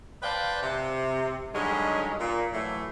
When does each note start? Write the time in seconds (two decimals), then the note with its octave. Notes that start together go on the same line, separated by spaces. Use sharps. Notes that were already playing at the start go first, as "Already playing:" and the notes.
0.22 B4 C5 D5 F5 G5 A5
0.62 C3
1.53 G2 D3 F#3 G#3 C#4 D#4
2.19 A#2
2.52 A2 E3 F#3 A3